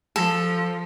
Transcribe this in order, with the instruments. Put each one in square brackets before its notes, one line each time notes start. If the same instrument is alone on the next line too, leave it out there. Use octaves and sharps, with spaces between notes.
[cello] F3 [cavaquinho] A4